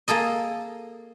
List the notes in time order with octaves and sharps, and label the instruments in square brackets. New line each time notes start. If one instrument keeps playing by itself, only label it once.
[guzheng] A#3 G#4 A4 D#5